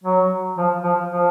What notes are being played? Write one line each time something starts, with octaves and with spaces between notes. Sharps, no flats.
F#3
F3
F3
F3